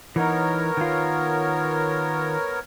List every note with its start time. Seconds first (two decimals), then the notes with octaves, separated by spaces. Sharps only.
0.16 E3 B3 D#4 A#4 C#5
0.77 D#3 F4